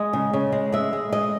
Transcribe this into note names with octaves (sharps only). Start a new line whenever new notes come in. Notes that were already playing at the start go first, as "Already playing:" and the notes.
Already playing: G#3 D#5
C#3
C#3
G#3
G#3 E5
G#3
G#3 D#5